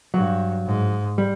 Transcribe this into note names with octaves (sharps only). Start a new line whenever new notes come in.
G2 F#3
G#2
G3